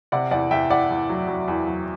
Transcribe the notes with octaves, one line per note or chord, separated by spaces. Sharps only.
C3 D5 F#5
E2 D5 F#5
E2 E5 G5
E2 D5 F#5
E2
F#3
F#3
E2
F#3